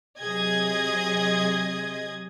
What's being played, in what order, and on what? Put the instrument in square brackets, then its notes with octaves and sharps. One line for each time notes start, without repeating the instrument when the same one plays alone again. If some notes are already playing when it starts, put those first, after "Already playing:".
[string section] C3 F#3 G#4 D#5 D#6 G#6